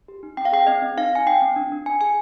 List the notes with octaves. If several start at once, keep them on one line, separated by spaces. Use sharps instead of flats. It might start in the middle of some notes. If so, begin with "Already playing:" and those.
G4
D#4
C4 G5
F5
G#4 G5
C4 D#5
C4
D#4 F5
D#4 G#5
D#4 G5
C4
D4
D4
D4 G#5
G#4 G#5